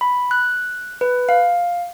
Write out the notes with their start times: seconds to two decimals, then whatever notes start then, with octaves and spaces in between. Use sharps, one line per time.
0.01 B5
0.31 F#6
1.01 B4
1.29 F5